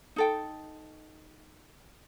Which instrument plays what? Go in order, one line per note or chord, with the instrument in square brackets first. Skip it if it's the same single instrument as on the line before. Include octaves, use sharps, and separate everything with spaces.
[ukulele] D#4 A4 G5